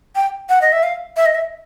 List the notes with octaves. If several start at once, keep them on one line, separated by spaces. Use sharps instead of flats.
G5
F#5
D#5
E5
F5
E5
D#5
E5